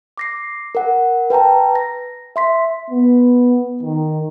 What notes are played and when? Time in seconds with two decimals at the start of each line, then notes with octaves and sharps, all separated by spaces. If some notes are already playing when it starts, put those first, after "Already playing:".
0.17 D6 A#6 C7
0.75 A#4 F#5
1.30 B4 G5 A5 A#5
1.75 A#6
2.36 E5 C6 B6
2.90 B3
3.83 D#3